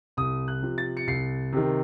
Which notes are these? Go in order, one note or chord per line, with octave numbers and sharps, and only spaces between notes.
C2 D#6
F#6
C3 F3
A6
C#7
C2 C7
C3 D#3